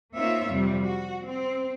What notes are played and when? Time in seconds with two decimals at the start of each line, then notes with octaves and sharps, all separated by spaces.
0.15 A#3 C4 D#4 F4 C#5 E5
0.49 F2 C3 G3
0.82 F#4
1.25 C4